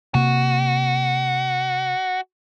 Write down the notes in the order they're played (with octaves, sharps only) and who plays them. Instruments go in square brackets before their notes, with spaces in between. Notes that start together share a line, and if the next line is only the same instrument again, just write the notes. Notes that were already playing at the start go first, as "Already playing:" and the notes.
[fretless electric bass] C3 A#3 [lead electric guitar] F#4